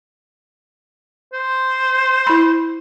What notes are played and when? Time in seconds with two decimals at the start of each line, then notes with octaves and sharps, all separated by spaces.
1.33 C5
2.27 E4 B5